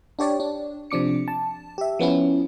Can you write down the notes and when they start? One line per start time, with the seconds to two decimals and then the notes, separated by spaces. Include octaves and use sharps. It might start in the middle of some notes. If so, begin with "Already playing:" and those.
0.19 D4 G4 C#5 D5
0.40 D4
0.91 C3 F3 D4 D6 C#7
1.28 A5
1.78 G4 E5
1.99 F3 B3 C#4 E4